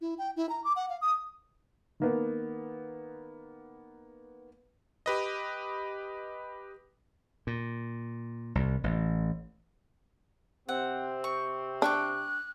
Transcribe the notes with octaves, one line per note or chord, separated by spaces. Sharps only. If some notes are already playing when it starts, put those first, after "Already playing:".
E4
G5
E4
A#5
D6
F#5
F5
D#6
D#3 A#3 B3
G4 B4 D#5
A#2
C2
A1
C3 C4 F#5
C#6
D4 G5 C#6 D6 F#6